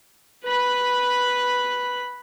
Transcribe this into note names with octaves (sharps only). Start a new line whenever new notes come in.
B4 B5